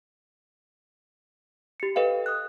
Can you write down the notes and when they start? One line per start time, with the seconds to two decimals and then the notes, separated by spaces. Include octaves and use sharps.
1.80 G4 C#7
1.96 A4 B4 D#5 F5 G5
2.26 D#6 F#6